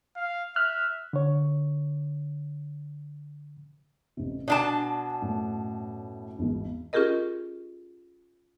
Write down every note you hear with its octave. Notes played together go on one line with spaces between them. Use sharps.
F5
E5 F6 F#6
D3 C#5
A1 C3
B2 D4 D5 G#5 A5
F#2 A2
G#1 E2
C#4 F4 G4 G#4 A#4 D#5